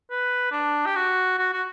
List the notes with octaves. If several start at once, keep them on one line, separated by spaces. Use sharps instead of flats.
B4
D4
G4
F#4
F#4
F#4